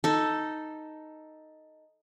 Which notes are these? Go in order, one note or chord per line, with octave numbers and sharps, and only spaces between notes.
D#4 A4